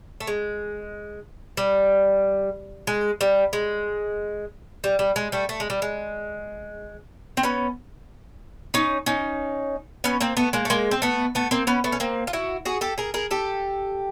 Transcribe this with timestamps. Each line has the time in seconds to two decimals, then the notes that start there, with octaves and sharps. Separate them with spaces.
0.20 A3
0.27 G#3
1.57 G3
2.87 G#3
3.21 G3
3.53 G#3
4.84 G3
4.99 G3
5.16 G#3
5.32 G3 A3
5.49 A3
5.60 G#3
5.70 G3
5.82 G#3
7.37 C4
7.43 B3 C#4
8.74 C#4 D#4
9.06 C#4 D#4
10.04 B3 C#4
10.21 A#3 C4
10.37 A3 B3
10.53 G#3 A#3
10.65 A3
10.70 G#3 A#3
10.91 C4
11.02 A3 B3
11.35 A3 B3
11.51 A#3 C4
11.67 B3 C#4
11.84 A3 B3
11.92 C#4
12.00 A#3 C4
12.27 F4
12.33 E4 F#4
12.65 F#4 G#4
12.81 G4 A4
12.98 G#4 A#4
13.14 G#4 A#4
13.31 G4 A4